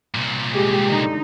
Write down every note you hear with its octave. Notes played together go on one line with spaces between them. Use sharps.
C2 A#2
G#3 G4 G#4
D3 D#4